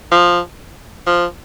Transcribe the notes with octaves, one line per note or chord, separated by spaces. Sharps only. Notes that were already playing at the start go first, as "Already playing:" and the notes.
F3
F3